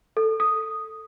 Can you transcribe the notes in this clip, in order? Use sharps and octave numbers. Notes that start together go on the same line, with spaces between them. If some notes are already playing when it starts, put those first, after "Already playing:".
A4
D#6